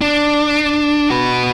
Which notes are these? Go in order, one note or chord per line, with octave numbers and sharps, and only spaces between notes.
D4
F#4 B4